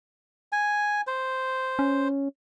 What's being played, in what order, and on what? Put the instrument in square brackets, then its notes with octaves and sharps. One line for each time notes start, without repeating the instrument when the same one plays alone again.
[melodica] G#5
C5
[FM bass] C#4